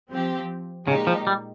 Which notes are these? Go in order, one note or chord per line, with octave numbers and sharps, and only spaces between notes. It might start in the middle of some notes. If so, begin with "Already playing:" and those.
F3 C4 G4
A#2 C#3 G#3 D#4 G4
F3
G3